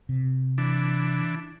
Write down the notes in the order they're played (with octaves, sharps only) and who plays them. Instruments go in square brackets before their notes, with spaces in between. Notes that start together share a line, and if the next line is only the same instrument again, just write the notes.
[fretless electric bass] C3
[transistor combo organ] E3 D4